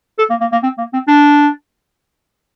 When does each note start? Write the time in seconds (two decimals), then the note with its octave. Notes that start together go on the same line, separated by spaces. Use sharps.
0.19 A4
0.30 A#3
0.41 A#3
0.52 A#3
0.63 C4
0.78 A#3
0.93 C4
1.08 D4